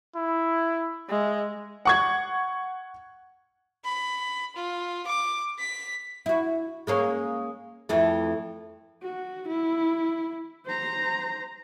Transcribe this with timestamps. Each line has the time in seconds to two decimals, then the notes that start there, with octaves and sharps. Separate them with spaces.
0.15 E4
1.09 G#3 E5
1.85 F#5 C#6 G#6
3.85 B5
4.56 F4
5.07 D6
5.59 B6
6.26 E4 F#4
6.87 G#3 A#3 C#4
7.89 F2 E3 A3
9.02 F#4
9.48 E4
10.66 C5 A#5